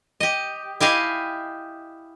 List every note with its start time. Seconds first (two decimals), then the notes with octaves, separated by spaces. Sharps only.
0.20 G4 D#5
0.80 E4 G4 D#5 F5 G#5